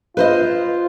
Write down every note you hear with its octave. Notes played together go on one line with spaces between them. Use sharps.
F4 B4 C5 D#5